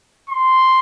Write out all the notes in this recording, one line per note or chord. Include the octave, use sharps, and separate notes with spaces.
C6